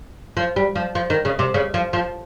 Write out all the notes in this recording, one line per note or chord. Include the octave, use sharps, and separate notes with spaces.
F3
G3
F3
F3
D#3
C#3
C3
C#3
F3
F3